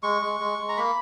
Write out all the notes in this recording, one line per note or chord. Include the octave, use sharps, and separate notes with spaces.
G#3 C#6
G#3
G#3
G#3
A#5
A#3 B5